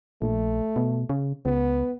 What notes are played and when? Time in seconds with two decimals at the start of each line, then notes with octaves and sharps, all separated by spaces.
0.22 A#1 A3
0.76 B2
1.10 C#3
1.45 C#2 B3